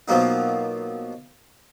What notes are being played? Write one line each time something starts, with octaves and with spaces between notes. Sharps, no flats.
B2 F3 F#3 A#3 D#4